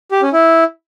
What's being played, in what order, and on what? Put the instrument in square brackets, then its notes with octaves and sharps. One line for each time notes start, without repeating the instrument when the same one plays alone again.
[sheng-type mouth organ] G4
C#4
E4